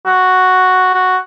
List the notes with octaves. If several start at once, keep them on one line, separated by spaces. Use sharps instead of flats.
F#4
F#4